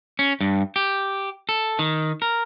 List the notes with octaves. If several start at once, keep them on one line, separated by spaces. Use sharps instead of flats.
C#4
G2
G4
A4
D#3
A#4